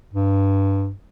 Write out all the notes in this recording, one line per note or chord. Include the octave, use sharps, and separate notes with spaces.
G2